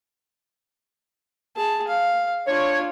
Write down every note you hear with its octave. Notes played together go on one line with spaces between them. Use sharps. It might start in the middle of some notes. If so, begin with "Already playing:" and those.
G#4 A5
F5
D4 F4 C#5